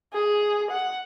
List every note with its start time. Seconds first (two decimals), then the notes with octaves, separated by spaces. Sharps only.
0.13 G#4
0.71 F#5